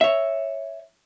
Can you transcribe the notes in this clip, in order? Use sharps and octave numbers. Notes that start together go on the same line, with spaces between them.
C#5 E5